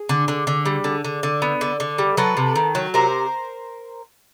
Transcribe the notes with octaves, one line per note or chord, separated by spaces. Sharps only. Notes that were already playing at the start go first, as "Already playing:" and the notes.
Already playing: G#4
D3
D3
D3
G3
D3
D3
D3
B3
D3
D3
G3
F#3 A4 B4
C3
D#3
F#3
C3 A#4 C5